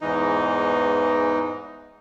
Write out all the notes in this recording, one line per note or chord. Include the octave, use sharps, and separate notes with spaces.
E2 G#2 E3 D#4